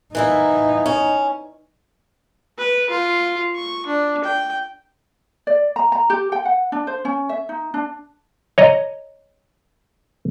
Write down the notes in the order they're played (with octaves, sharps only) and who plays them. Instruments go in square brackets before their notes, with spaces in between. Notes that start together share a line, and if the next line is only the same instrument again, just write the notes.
[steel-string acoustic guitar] E3 A#3 E4 [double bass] D#4
[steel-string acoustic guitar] C#4
[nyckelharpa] B4
F4
C#6
D4
G5
[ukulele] D5
A#5
A#5
G4
G5
F#5
D4
C5
C#4
E5
D#4
D4
[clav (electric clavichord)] C#5 D#5 A#5